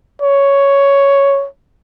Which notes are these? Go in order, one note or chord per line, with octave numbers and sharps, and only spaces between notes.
C#5